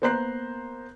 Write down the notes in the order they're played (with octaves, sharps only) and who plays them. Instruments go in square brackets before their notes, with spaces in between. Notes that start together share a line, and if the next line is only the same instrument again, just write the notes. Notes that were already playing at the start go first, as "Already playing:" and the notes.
[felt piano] A#3 B3 C5 A#5 F#6 C7